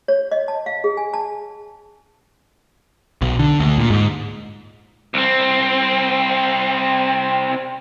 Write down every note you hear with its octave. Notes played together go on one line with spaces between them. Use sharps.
C#5
D#5
A5
F5
G#4
G#5
A5
B1
D3
D2
A#2
G#2
C2 C4